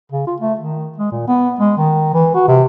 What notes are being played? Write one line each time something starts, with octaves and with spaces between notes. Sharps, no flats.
C#3
F4
A3
D#3
G#3
A#2
B3
G#3
D#3
E3
F#4
C3